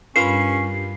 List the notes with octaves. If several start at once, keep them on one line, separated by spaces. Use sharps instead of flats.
G2 C#4 F4 A#4 B4 C7